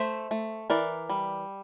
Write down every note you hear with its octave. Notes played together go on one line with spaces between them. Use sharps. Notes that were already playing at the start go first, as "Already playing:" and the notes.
Already playing: A3 C5 E5
A3
E3 A#4 D5
G3